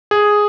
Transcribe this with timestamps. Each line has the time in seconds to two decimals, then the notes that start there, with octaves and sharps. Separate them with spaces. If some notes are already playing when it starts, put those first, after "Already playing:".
0.11 G#4